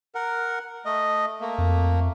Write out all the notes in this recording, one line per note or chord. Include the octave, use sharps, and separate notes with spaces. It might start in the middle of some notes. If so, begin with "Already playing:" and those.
A#4 F#5
A3 D#5
A3 A#3
F2